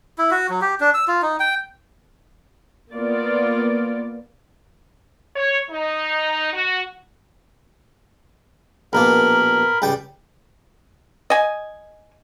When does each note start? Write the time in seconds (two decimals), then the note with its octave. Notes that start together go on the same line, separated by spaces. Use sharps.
0.18 E4
0.31 F#4
0.50 F#3
0.62 G4
0.81 D4
0.94 E6
1.08 F4
1.22 D#4
1.40 G5
2.93 A#3 B3 F4 D5
5.36 C#5
5.70 D#4
6.53 F#4
8.93 A#1 B2 A#3 A#4 B5
9.82 C#2 G3 G5
11.30 D#5 G#5